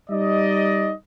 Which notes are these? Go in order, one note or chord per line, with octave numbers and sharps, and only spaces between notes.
G3 D#4 D5 D#5